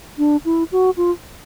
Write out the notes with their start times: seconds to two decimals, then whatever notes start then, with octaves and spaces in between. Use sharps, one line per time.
0.18 D4
0.45 E4
0.72 F#4
0.97 F4